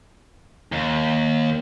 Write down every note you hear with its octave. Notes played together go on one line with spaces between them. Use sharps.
D#2